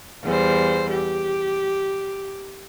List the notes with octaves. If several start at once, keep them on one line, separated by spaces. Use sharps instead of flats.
E2 G3 C5
G4